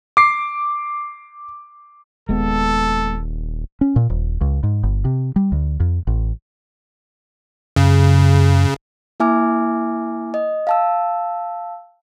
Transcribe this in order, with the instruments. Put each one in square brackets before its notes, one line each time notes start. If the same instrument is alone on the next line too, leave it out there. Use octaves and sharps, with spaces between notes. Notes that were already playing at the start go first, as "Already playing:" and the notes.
[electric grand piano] D6 C7
[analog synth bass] D#1 [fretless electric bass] G#3 B3 [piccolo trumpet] A4
[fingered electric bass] C#4
A#2
D#1
C#2
G#2
G1
C3
G3
D2
F2
A1
[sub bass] F#2 [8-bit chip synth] C#3
[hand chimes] A#3 E4 E5 G#5 D6 F6
D#5
F5 A5 E6